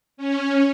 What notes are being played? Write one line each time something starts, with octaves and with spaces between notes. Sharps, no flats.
C#4